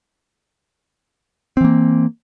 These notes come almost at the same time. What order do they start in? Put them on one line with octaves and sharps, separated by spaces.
C4 E3 A#3